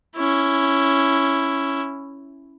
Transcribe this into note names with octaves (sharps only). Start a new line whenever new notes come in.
C#4 E4